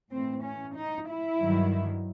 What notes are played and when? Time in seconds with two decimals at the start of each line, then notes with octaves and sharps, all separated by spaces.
0.11 A2 E3 C4
0.43 C#4
0.75 D#4
1.08 E4
1.40 G2 D#3 F#3